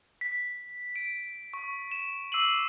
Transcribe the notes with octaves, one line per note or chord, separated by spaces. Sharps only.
B6
D7
C#6
E7
D6 E6 C7 D#7 F#7